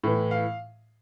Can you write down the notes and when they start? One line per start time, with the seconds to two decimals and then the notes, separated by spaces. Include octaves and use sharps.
0.04 A2 E3
0.31 F5